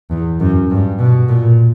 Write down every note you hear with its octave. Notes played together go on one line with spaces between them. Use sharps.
E2
F#2
G2
B2
A#2